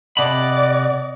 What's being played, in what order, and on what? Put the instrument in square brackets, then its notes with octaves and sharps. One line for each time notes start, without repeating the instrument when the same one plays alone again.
[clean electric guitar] C3 B5 [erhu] D5 [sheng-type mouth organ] D#5 F#5